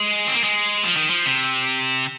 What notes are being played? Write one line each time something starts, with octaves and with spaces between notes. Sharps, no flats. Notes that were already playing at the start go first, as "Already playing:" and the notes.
Already playing: G#3
C4
A#3
G#3
F3
D#3
F3
C3